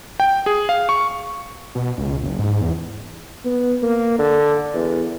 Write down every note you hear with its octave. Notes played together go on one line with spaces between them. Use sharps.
G5
G#4
F5
C#6
B2
C#2
F#1
G#2
E2
B3
A#3
D3
E2